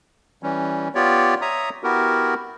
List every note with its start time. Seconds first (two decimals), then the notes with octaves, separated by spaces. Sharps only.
0.43 E3 G3 C#4
0.95 B3 F4 G4 C#5 D5
1.42 C#5 E5 A#5 D#6
1.84 B3 E4 F#4 G4 A#4